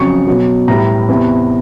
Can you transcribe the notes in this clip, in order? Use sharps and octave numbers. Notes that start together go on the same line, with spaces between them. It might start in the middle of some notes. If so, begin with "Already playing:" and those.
Already playing: F2 C#3 F#3 C#6
B2 F#3
A2 E3 G3 A#5
E2 C3 E3